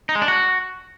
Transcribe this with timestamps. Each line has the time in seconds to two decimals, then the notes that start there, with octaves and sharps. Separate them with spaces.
0.09 D#4
0.15 G#3
0.22 D4
0.28 F#4